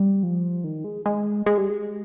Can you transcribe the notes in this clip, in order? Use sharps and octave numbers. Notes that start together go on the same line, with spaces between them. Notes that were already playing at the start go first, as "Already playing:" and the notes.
Already playing: G3
F3
D#3
G#3
G#3
G#3
G3
G#3